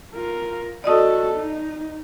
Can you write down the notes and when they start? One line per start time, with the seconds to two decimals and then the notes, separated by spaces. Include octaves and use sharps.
0.14 F4 A#4
0.84 F#4 A4 D5 D#5 D#6
1.35 D#4